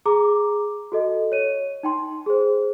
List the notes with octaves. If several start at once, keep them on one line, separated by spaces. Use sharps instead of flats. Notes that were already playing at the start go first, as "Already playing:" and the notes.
G#4 A#5 D6
F#4 A4 D#5
C#5 D#7
D#4 G5 C6
G#4 C5